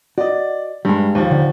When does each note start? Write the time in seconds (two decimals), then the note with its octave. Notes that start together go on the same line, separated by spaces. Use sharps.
0.18 F#4 D5 D#5
0.85 G2 G3 G#3
1.15 D#2 F3
1.31 D3